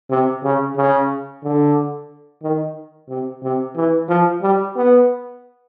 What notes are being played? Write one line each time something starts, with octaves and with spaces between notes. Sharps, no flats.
C3
C#3
C#3
D3
D#3
C3
C3
E3
F3
G3
B3